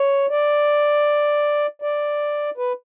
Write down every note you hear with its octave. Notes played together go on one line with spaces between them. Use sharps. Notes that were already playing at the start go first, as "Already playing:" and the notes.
Already playing: C#5
D5
D5
B4